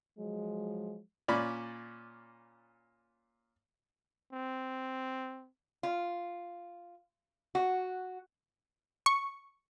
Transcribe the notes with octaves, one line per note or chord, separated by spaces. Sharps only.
F3 F#3 G#3
A#2 C#4 D5 B5
C4
F4
F#4
C#6